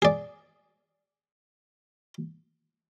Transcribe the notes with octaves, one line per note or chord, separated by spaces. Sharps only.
G#4 D5